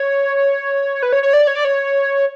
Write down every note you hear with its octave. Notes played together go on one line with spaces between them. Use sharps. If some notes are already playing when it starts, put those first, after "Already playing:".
Already playing: C#5
B4
C#5
C#5
D5
C#5
D5
C#5